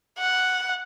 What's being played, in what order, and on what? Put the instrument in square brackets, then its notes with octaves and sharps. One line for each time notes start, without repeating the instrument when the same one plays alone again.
[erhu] F#5